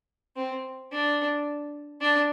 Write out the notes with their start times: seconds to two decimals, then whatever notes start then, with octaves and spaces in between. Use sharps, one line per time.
0.36 C4
0.92 D4
2.01 D4